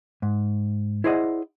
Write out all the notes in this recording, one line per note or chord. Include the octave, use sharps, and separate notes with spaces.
G#2
E4 G#4 C5 D5 D#5 F#5